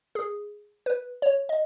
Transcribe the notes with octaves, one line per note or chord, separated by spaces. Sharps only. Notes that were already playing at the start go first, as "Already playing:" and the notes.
G#4
B4
C#5
D#5